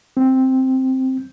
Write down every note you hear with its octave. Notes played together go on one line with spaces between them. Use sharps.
C4